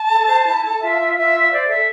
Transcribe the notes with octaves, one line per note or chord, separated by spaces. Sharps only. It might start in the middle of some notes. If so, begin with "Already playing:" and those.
Already playing: A5
A4
C5
E4
A4
F4 E5
F4
F4 E5
F4
E5
C5 D5
A4 E5